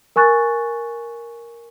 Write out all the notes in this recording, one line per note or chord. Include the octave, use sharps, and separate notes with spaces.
A#4 G#5 C#6 F#6 A6